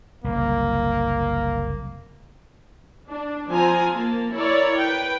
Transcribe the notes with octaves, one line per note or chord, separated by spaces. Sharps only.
F#1 C2 A#3
D4
F3 C4 F4 G#5 A#5
A#3 A5
E4 A#4 C#5 D5
B4 G5